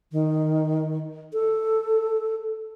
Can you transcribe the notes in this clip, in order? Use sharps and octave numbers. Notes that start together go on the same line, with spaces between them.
D#3
A4